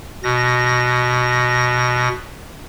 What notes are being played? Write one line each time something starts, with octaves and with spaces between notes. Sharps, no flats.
B2 A#6